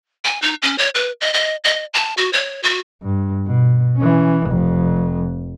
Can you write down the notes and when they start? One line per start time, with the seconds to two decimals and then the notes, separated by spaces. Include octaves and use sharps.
0.25 G#5
0.42 D#4
0.62 C#4
0.78 C#5
0.95 B4
1.21 D#5
1.34 D#5
1.64 D#5
1.94 A5
2.17 F#4
2.33 C#5
2.63 F#4
3.03 G2
3.46 B2
3.97 E3 C#4
4.46 F1 F2